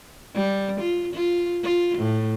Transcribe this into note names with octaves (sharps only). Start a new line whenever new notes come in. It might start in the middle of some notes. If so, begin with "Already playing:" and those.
G3
F4
F4
F4
A2